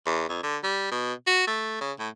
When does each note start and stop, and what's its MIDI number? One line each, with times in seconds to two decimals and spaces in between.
0.06 0.25 40
0.29 0.40 41
0.43 0.57 50
0.63 0.88 55
0.91 1.13 47
1.27 1.46 66
1.47 1.76 57
1.81 1.92 49
1.99 2.09 45